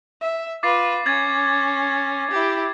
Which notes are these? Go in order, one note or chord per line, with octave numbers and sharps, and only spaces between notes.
E5
F4 B4 D6 A6 C7
C#4 G#6 A6
E4 G4